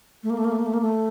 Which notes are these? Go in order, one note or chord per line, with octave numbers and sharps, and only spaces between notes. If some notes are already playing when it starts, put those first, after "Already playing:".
A3
A#3
A3
A#3
A3
A#3
A3
A#3
A3